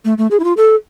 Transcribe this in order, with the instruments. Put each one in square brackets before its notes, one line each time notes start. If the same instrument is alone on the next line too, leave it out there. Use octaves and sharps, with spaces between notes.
[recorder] A3
A3
G#4
E4
F4
A4